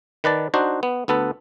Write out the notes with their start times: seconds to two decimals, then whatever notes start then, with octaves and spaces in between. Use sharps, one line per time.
0.24 D#3 B4 D5 A5
0.54 D4 D#4 F#4 C5
0.83 B3
1.08 D2 B3 A4 B4